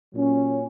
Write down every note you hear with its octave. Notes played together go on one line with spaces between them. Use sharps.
A#2 F#3 C#4